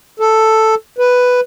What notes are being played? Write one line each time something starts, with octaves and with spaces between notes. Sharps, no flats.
A4
B4